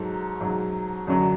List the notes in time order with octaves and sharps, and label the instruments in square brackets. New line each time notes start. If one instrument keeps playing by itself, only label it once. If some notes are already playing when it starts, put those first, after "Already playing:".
Already playing: [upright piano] G#2 F#3 A4
G#2 F#3
F#2 D3 F#3